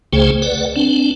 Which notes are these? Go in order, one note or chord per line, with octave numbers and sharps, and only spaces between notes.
C#2 C#3 A3 G#4 C5 G5
B4 D5 F#5
C4 D4